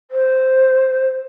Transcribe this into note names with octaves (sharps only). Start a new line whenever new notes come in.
C5